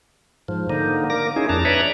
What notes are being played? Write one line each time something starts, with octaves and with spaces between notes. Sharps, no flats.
G#2 F3
D3 A#3 D#4
A#3 A#4 D6 A#6
C#4 D#4 E4 G#4
F2 D4 A5 A#5
B4 C#5 D5 E5 A#5